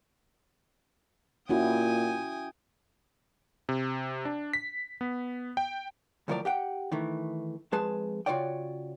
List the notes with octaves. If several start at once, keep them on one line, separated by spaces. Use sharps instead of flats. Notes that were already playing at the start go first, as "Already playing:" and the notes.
A#2 C#4 E4 F#4 G5 G#5 D#6
C3
D4
B6
B3
G5
D2 A2 F3 F#3 A#4 D5
G4 F#5 G5
D#3 E3 A3
F2 G#3 G#4 B4 A5
C#3 F4 F#4 C#5 D5 G5